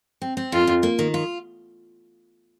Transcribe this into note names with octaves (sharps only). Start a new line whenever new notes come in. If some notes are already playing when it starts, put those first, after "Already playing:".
C4
C4
F2 F4
F2
A#3
D#3
F4